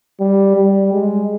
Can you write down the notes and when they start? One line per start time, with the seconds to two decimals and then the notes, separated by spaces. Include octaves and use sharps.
0.20 G3
0.56 G3
0.93 G#3